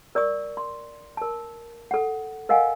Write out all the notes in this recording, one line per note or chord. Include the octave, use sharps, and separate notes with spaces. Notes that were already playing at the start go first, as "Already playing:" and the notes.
A#4 D5 C#6 D#6
C6
A#4 A5
A4 F#5
A#4 D#5 F5 F#5 G#5